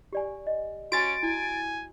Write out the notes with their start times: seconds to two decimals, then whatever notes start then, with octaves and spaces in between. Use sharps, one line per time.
0.13 G4 D5 G#5
0.47 D#5
0.92 C#4 F#4 G#5 A6 D7
1.23 E4 G#5